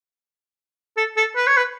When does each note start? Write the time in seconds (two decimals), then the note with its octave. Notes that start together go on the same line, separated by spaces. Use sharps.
0.97 A4
1.17 A4
1.36 B4
1.47 C#5
1.57 B4